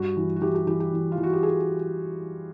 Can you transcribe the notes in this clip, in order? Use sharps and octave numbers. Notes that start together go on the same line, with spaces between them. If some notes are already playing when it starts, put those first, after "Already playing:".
Already playing: G2 F#4
E3
F#4
E3 G4
G4
E3 G4
G4
E3
F4
E3
F#4
G4
G#4